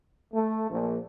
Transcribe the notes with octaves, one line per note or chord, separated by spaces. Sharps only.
A3
A#1